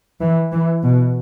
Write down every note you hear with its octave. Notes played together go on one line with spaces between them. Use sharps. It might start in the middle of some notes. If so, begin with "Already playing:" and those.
E3
E3
B2